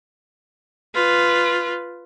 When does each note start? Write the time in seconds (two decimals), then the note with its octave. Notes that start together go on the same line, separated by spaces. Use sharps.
0.95 F4 B4